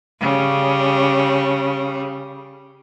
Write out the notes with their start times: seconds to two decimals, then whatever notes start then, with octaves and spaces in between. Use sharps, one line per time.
0.22 C#3 G3